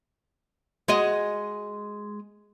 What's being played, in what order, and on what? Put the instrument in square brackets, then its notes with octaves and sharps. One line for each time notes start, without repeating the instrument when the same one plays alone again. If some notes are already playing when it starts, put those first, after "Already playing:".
[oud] G#3 F#4 D#5